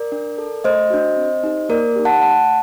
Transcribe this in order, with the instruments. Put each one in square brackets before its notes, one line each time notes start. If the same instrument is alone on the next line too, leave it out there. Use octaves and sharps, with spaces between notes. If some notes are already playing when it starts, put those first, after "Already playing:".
Already playing: [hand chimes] A#4 D5
D4
A4
A3 C5 D#5
D4 F#4
C4
D#4 G4
A#3 A#4 D5
D#4 G4
F#5 A5
A3 F#5 A5